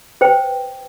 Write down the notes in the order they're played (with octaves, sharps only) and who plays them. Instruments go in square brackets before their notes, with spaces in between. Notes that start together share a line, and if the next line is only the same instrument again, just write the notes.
[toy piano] B4 C5 G5